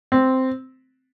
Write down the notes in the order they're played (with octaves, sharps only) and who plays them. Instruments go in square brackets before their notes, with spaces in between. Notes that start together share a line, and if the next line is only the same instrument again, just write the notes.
[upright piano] C4